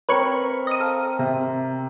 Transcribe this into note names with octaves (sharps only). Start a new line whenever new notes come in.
C4 A#4 B4 C#5 E5 C#6
D#5 D#6
A4 F5
C3